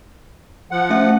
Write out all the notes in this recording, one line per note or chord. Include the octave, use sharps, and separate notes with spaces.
F3 F#5
A3 C#4 E5